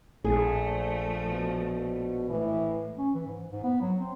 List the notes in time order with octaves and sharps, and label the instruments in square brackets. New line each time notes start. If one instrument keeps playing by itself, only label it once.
[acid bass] A#1 [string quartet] F3 A3 [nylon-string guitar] G#4
[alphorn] B2
[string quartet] A2 [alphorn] E3
[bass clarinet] C#4
E3
G#2
G#2
B3
F#3
C4